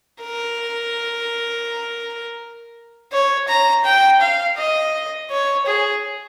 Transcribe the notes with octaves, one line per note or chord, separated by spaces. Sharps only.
A#4
C#5
A#5
G5
F5
D#5
C#5
G#4